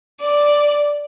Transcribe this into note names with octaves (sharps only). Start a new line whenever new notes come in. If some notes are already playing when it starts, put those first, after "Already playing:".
D5